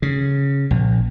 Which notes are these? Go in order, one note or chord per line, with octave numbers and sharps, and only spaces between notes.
C#3
A#1